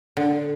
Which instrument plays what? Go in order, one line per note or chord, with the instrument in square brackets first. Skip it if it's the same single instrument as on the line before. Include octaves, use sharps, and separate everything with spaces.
[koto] D3